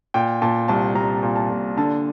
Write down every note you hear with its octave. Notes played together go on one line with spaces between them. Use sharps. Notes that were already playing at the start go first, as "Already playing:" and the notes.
A#2 G5
A#2 A5
C2 A5
C2 A#5
A#2
A5
A#2
D3 A5